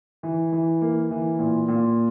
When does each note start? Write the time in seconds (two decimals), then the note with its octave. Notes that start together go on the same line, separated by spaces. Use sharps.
0.23 E3
0.52 E3
0.82 A#3
1.11 E3
1.39 A#2
1.68 A#2